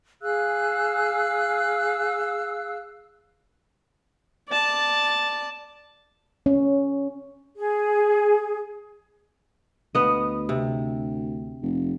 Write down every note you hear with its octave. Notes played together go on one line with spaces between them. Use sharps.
G#4 F5 E6 F#6
D5 A5
C#4
G#4
D2 B3 D#5
C3
F1